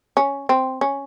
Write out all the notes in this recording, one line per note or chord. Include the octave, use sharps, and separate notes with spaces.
C#4
C4
C#4